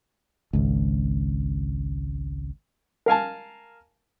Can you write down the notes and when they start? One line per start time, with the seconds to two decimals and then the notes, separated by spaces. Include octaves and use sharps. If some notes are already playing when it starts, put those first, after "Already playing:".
0.53 G#1 C#2
3.06 A#4 F5 G#5 A5